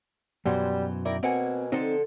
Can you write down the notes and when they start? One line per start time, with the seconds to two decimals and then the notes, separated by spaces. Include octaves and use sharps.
0.46 F#2 B2 E3 F#3 G3 C5
1.05 D#3 E4 A#4 D5
1.23 B2 A#3 C4 F#5 G#5
1.72 D3 F3 C4 D#4 A4